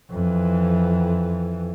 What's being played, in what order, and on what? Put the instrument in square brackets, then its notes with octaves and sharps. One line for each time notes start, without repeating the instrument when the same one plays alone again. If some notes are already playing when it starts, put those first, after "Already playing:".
[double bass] F2 E3